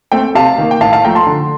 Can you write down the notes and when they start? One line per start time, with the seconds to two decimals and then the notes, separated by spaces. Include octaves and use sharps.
0.12 A3 C4 G5
0.35 C3 F5 A5
0.58 D#3 A#3
0.71 G5
0.81 A2 F5 A5
0.93 F5 A5
1.05 F3 A3 G5 A#5
1.15 A5 C6
1.27 D3